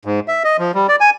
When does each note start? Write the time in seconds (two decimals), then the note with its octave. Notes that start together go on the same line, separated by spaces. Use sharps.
0.05 G#2
0.28 E5
0.44 D#5
0.59 F3
0.75 G3
0.89 D5
1.00 G#5